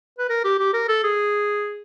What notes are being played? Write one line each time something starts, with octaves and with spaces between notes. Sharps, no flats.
B4
A#4
G4
G4
A#4
A4
G#4